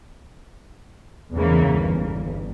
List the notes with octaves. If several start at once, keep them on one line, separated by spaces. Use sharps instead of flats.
E2 G#2 C#3 E3 A#3
G1